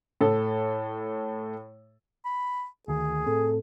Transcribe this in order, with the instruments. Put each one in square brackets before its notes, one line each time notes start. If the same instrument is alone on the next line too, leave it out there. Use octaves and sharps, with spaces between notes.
[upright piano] A2 A4
[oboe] B5
[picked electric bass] D2 D#3 [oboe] G#4
[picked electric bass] A2 C4 [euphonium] A4